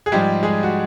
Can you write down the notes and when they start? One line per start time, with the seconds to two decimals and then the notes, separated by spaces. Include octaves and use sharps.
0.06 G#4
0.12 G#2 F3 G3 G#3 G4
0.43 G#3 G#4
0.63 F#4